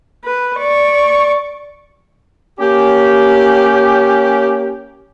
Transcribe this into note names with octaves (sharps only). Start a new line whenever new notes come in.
B4
D5 C#6
A#3 C#4 G4